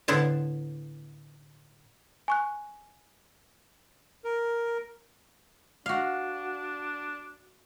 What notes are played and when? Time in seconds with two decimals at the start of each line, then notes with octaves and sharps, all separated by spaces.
0.08 A2 D3 B3 E4 C5 A5
2.28 G#5 C#6 F#6
4.24 A#4
5.86 D4 F#4 F5